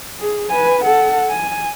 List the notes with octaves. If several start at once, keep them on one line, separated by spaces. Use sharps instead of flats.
G#4
B4 G#5
A4 F#5
G#5